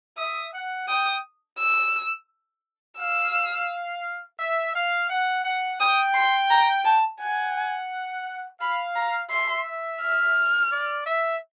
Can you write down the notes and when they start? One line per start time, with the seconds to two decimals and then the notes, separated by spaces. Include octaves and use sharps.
0.17 E5 D#6
0.54 F#5
0.88 G5 D#6
1.59 E6
2.99 F5 E6
4.39 E5
4.75 F5
5.09 F#5
5.45 F#5
5.80 G5 D#6
6.14 C6
6.50 A#5
6.85 A5
7.20 F#5 G#5
8.60 F5 B5
8.96 A#5
9.30 E5 C6
10.01 F6
10.71 D5
11.06 E5